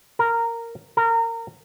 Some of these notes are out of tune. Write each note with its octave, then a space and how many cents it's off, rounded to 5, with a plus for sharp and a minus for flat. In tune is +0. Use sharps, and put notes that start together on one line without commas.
A#4 -10
A#4 -25